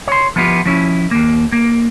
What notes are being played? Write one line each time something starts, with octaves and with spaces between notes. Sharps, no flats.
C#5 C6
F3 B3 E4 F4 G4
F3 C#4 E4
D#2 A#3
A#3